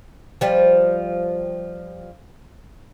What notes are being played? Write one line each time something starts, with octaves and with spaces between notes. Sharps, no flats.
F3 G3